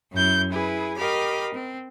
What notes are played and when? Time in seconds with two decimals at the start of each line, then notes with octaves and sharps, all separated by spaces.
0.13 F#2 E4 G6
0.50 E4 G#4 B4
0.97 G4 A#4 D#5 F5 B5
1.54 C4